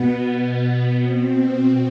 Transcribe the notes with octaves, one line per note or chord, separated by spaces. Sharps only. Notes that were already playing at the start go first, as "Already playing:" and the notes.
Already playing: B2 B3
B2 C4